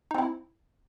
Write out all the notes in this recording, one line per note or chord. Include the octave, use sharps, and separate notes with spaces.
C4 D#4 E4